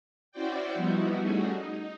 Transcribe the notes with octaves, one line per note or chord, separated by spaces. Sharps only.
C#4 E4 F#4 C5 D5 G5
F3 G3 B3 D#4 E4 F#4
G3 A3 C#4 D#4 F#4 G#4
D#4